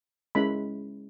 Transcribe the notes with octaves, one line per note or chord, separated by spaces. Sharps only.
G#3 C#4 E4 B5